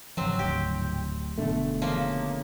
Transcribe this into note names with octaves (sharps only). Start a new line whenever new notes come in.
G#2 C#3 F3 F#3 C4
D1 G4
F1 B2 D3 A3
C#3 F3 A#3